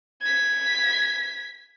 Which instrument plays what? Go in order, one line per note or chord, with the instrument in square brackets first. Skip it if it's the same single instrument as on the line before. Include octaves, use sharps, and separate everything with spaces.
[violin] G#6 B6